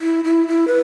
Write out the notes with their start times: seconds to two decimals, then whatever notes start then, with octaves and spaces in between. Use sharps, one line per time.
0.01 E4
0.24 E4
0.48 E4
0.68 B4